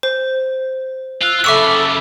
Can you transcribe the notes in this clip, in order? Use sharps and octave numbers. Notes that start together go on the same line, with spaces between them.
C5
F4 E6 F#6
F#2 C#3 A4 E5 B5 C#6 D6 E6